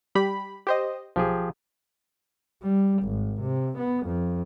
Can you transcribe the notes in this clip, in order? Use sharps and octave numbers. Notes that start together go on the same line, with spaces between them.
G3 G4 B5
G4 C5 D#5
B1 F3 G4 G#4
G3
G#1
C3
B3
F2